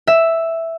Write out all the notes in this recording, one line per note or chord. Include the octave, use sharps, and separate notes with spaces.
E5